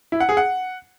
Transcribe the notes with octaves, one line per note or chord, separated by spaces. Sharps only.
E4
F#5
G#4
F#5